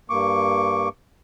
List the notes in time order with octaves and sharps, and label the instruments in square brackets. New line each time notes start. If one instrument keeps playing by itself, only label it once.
[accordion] G2 A#3 C#6 D6